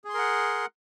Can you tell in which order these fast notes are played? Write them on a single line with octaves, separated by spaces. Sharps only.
G#4 C6 A#4 F#5